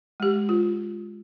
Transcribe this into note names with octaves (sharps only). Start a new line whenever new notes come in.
G#3 G4
F4